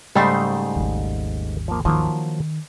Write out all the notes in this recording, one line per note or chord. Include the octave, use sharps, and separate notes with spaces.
G#2 C#3 G3 A3 D#4 C5
G#1 D#2
F3 A#3
D#3 F3 F#3 A#3